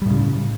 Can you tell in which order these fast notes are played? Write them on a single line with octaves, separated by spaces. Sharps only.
G3 A2 C#3